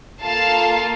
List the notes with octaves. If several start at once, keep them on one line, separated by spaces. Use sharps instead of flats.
A#3 F4 A4 F5 A5